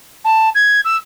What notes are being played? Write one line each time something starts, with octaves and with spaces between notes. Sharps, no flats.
A5
G#6
E6